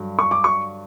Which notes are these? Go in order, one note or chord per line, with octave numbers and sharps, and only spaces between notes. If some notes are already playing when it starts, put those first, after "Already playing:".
Already playing: G2 D3 F#3
C#6
D6
C#6